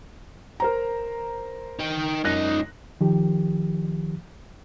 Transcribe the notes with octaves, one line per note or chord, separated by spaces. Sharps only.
A#4 C5 A#5
D#4 G5
C#2 F#2 D#4 F#6 A#6
D#3 F3 G4